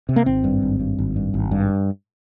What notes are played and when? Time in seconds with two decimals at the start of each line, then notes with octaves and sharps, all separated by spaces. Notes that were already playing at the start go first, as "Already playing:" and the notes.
0.09 C3
0.16 A#3
0.26 G#1 C4
0.44 G2
0.62 G#1
0.80 G2
0.98 G#1
1.16 G2
1.34 G#1
1.51 G2